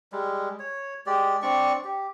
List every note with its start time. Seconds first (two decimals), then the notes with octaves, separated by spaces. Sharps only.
0.12 G3 G#3
0.59 C#5
1.06 G#3 G4 D5
1.42 C4 D4 D5 C#6
1.84 G4